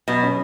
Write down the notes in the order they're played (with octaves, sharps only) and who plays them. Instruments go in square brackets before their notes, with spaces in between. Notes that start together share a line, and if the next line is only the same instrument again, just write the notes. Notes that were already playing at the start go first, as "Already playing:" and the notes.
[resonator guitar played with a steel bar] B2 [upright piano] F#3
[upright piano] C#4